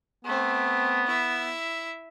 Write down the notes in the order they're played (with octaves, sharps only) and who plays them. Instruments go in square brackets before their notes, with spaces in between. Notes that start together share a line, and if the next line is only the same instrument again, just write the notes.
[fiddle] A3 C4 [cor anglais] B3
[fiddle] E4 E5